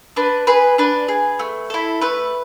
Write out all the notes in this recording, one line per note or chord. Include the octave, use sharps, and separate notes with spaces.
D4 B4
G#4 B4
D4 B4
G#4
A3
E4 A4
A3 B4